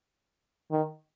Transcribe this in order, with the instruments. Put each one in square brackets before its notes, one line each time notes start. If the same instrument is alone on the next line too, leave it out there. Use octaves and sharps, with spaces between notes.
[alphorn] D#3